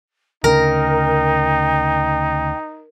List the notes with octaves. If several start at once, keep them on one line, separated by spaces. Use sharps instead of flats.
D2 C#3 D#4 A#4 G5